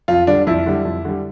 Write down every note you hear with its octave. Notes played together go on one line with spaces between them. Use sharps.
F2 F4
D3 G3 D4
F2 E4
D3 G3
F2
D3 G3